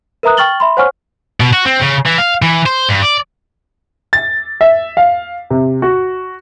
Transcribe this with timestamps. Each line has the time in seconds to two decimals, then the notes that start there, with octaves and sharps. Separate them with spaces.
0.23 A#4 B4 E5 A#5 D#6 F#6
0.37 G5 C#6 F6 A6 F#7 G7
0.60 E5 B5 C6
0.77 C5 C#5 F#5 G#5 C#6 F6
1.40 B2
1.53 F#4
1.66 C4
1.82 C#3
2.06 E3
2.18 F5
2.42 E3
2.66 C5
2.89 G2
3.02 D5
4.13 A6
4.61 E5
4.97 F5
5.50 C3
5.82 F#4